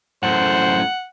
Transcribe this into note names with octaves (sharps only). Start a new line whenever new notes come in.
F#2 A2 C5 F#5